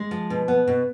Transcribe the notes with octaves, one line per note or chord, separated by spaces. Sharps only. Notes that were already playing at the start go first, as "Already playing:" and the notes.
Already playing: G#3
F3
B2
B3
B2